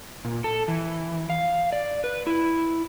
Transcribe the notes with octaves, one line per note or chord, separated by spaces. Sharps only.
A#2
A4
E3
F5
D5
B4
E4